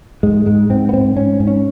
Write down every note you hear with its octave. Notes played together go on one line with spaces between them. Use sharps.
G#2 G#3
G#2 G#3
G#2 C4
B3
G#2 C4
G#2 C#4
G#2
C#4